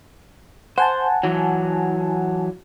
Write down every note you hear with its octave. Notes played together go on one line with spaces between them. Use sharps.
C5 F#5 G#5 A5
E3 F#3